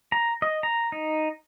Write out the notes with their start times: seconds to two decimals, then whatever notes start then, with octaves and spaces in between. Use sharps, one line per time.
0.12 A#5
0.42 D#5
0.63 A#5
0.92 D#4